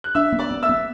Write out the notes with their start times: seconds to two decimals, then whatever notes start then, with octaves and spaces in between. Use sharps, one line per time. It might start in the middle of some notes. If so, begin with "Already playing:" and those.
0.04 F#6
0.15 D4 E5 E6
0.32 B3
0.39 D5 D6
0.51 B3
0.63 E5 E6
0.69 B3